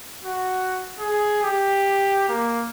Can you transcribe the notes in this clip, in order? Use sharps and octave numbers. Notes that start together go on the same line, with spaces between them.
F#4
G#4
G4
A#3